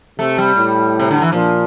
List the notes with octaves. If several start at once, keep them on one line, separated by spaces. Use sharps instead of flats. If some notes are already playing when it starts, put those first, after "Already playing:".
C3 A3
G3
A2
C3
D3
E3
A#2 F3